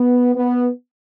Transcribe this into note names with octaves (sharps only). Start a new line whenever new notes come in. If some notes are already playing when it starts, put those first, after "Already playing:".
Already playing: B3
B3